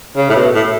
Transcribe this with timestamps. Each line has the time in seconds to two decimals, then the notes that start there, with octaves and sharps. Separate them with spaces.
0.16 C#3
0.29 A2
0.35 B2
0.54 A2